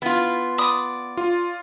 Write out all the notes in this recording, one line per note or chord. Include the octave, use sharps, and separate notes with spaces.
B3 E4 F4
D5 B5 D#6
F4